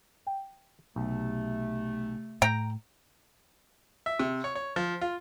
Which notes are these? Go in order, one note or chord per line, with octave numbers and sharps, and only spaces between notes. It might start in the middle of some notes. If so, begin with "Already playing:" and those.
G5
B1 C3 A3
A2 G5 A#5
E5
C3
C#5
C#5
F3
F4